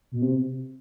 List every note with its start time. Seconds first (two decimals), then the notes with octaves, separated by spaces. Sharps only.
0.12 B2
0.22 C3